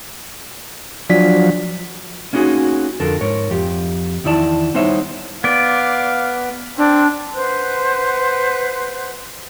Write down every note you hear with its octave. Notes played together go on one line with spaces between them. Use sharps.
F3 F#3 D4 D5 B6
A#3 C#4 D#4 F#4 G#4
F2 D3 A4 A#4
G#2 A#4 C#5
F2 G4
E2 D#3 E4 D5 A5
G3 B3 D#4 C5 C#5 E5
B3 D5 F5
C4 D4
B4 C5 F#5 F#6